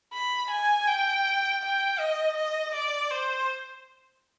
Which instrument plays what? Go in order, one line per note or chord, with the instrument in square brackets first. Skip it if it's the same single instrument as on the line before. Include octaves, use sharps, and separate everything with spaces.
[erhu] B5
G#5
G5
G5
D#5
D#5
D5
C5